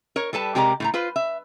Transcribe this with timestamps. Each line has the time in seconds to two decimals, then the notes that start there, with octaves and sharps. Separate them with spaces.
0.16 A#4 C#5
0.33 G3 A4 B4 A5
0.55 C3 G#3 G4 A#4 D5 A#5
0.80 A2 A3 A#5
0.94 F4 B4 C5
1.16 E5